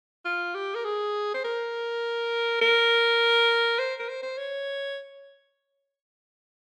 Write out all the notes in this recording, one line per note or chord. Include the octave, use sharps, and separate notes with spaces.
F4
G4
A#4
G#4
C5
A#4
A#4
C5
A#4
C5
C5
C#5